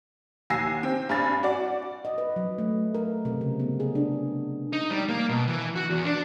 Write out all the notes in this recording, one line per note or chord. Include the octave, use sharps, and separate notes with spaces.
D#2 G#5 E6 A#6 C7
C4
G2 G#5 A6
F#4 D5
D#5
B4
F#3
A3
A#4
C3
C#3
B3
G#4
D4
D#4
G3
A#3
B2
E3
F#4
E2
D4